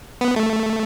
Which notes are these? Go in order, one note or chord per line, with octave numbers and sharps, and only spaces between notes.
B3
A3